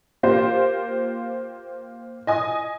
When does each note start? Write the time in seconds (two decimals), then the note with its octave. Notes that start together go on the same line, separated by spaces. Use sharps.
0.23 A#3 F4 G4 C5
2.27 D#5 G#5 D#6